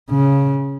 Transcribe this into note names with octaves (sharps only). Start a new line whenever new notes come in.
C#3